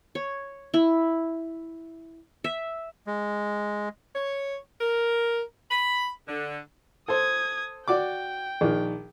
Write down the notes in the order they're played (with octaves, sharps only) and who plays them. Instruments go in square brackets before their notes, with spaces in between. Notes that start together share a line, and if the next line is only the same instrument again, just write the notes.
[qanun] C#5
E4
E5
[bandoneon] G#3
[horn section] C#5
A#4
B5
D3
[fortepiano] A4 C5 [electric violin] D#6 G#6
[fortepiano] F#4 D5 D6 [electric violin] G5
[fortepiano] A#1 D#3